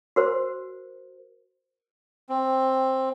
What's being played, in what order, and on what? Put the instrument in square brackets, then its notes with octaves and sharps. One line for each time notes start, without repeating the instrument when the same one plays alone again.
[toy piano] F#4 A#4 C5
[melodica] C4